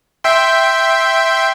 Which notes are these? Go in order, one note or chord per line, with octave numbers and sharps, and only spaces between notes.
E5 G5 C6